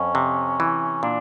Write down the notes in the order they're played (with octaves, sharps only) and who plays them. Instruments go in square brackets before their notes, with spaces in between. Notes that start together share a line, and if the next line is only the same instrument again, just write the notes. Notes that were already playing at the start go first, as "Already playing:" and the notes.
Already playing: [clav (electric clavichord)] F2 [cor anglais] C#4
[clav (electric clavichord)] C3
E3
[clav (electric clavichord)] A#2 [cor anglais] D4